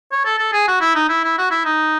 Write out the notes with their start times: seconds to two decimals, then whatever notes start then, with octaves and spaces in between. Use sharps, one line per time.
0.12 C#5
0.25 A4
0.39 A4
0.53 G#4
0.68 F#4
0.81 E4
0.96 D#4
1.09 E4
1.24 E4
1.38 F#4
1.51 E4
1.65 D#4